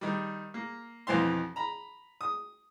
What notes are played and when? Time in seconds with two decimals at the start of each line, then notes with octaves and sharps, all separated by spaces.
0.01 D#3 G3
0.54 A#3
1.07 B1 F2 E3 C5 F5 C6
1.56 A#5 B5
2.21 D#6